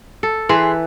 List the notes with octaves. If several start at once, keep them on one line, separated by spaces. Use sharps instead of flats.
A4
E3 G#4 B4 C6